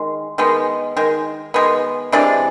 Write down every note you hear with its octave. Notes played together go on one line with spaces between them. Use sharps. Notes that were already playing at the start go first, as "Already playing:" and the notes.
Already playing: D#3 G#3
D#3 G#3 B3
D#3 G#3
D#3 G#3 B3
C3 E3 G#3 D4 D5